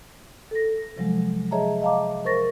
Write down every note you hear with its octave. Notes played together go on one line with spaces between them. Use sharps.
A4 A#6
C3 F3 F#3 G#3
G#4 C#5 D#5 E5 A5 A#5
D#5 F5 A5 A#5 D6
A#4 C5 C#6 A6 A#6